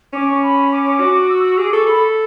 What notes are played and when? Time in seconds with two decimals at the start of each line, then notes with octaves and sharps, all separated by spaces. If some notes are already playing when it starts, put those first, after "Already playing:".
0.13 C#4 D6
0.27 C#6
0.42 B5
0.71 D6
1.00 F#4
1.29 E6
1.44 E6
1.58 G#4 D6
1.72 A4 C#6
1.87 A4 B5